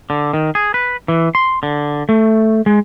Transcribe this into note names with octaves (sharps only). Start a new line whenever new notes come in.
D3
D#3
G#4
B4
E3
C6
D3
A3
G#3